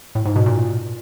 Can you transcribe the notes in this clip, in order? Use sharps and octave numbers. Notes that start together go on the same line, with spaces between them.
A2
G#2
B2
A#2